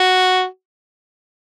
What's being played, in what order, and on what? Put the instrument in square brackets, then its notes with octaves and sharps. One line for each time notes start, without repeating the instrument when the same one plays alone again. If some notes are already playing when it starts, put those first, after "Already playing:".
Already playing: [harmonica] F#4